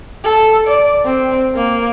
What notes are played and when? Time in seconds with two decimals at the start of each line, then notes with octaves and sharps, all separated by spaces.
0.24 A4
0.67 D5
1.05 C4
1.55 A#3